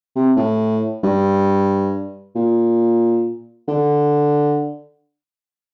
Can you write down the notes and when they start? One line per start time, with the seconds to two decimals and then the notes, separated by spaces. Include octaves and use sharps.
0.16 C3
0.37 A2
1.03 G2
2.36 A#2
3.68 D3